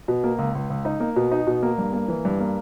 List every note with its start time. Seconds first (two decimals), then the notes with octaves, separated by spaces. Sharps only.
0.08 B2
0.24 A#3
0.38 C#2
0.55 C#2
0.70 C#2
0.85 D#4
1.00 A#3
1.16 B2
1.32 D#4
1.47 B2
1.63 A#3
1.78 G2
1.93 A#3
2.08 E3
2.25 G2
2.40 A#3